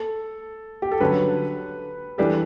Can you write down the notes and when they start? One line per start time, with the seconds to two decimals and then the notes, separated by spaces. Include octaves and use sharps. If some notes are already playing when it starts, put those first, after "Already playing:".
Already playing: A4
0.82 G4
0.92 A4
1.00 G2 D3 F#3 C#4 B4
2.18 E3 G3 D4 G4 A4